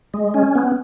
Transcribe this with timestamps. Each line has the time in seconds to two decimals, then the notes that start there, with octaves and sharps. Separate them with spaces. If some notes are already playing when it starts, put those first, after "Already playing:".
0.14 G#3
0.34 C#4
0.55 B3